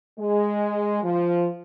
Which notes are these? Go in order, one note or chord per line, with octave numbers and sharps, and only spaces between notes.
G#3
F3